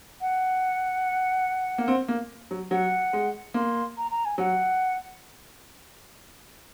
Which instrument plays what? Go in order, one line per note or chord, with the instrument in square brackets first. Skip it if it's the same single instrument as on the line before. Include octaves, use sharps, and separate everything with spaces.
[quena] F#5
[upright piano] A#3
C4
A#3
F#3
[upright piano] F#3 [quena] F#5
[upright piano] G#3
[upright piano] A#3 [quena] C6
[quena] A#5
A#5
G#5
[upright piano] F#3 [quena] F#5